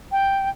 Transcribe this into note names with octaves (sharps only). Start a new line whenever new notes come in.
G5